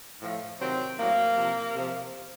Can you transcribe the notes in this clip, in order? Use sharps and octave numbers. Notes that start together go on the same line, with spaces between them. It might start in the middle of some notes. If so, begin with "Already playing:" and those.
A2 F3
C3 D#3 F#3 C4
A2 F#3 A#3
C3 F3
C3 F3